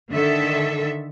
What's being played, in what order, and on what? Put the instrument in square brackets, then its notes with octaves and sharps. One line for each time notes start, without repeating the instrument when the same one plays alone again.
[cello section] D3 D#3 A4 E5